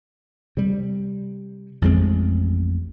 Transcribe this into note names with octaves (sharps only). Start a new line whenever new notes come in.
C3 G3
A1 F2 G#3 C4